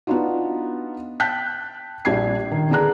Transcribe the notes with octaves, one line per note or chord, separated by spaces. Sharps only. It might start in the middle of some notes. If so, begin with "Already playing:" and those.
B3 D4 D#4 F4 F#4
G5 A5 F#6 G6 B6
A#1 G3 D4 G#6 C7
D#3
D3 B3 D4 G#4 A#5 F#6